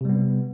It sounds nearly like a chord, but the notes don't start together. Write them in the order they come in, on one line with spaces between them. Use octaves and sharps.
C3 G3 B3